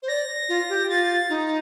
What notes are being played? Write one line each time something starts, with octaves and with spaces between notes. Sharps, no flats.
C5
D5 A#6
F4
G4
F4 A6
D#4